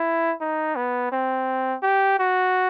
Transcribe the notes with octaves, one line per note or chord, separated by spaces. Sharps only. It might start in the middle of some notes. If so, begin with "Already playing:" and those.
Already playing: E4
D#4
B3
C4
G4
F#4